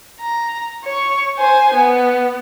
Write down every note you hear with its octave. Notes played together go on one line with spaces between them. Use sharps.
A#5
C#5 C#6
C5 G#5
B3